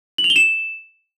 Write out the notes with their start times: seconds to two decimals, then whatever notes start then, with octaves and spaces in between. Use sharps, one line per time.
0.18 F#7
0.24 F7
0.30 G7
0.36 E7